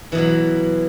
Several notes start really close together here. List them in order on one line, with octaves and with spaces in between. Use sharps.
E3 B2 F#3